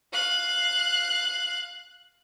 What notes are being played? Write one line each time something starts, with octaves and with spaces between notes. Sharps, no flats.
F5 F#6